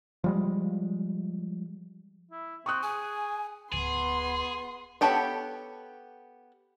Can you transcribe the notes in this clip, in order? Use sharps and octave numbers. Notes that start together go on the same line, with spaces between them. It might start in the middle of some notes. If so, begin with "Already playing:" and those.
F3 G3 G#3
E4
C4 C#6 D#6 F#6
G#4 G#5
D1 B3 G#4 C6
B3 G4 A4 C#5 F#5